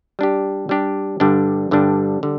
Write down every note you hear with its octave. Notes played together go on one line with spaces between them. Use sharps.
G3 D4 G4
G3 D4 G4
G2 D3 G3 D4
G2 D3 G3 D4
D3 G3